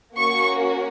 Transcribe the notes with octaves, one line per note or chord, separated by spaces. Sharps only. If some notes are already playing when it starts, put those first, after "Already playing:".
A#3 C#4 F#4 C#6